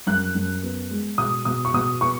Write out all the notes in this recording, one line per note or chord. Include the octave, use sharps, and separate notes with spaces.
F#2 F#6
F#2
B3
G#3
B2 D#6
B2 D#6
C#6
B2 D#6
B3 C#6